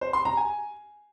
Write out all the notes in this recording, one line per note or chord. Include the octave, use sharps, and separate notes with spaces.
C5
C6
A#5
G#5